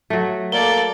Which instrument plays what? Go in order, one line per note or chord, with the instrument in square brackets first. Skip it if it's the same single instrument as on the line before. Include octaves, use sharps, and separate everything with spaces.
[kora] F#3 A3
[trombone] A#3 [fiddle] A4 D5 [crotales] G7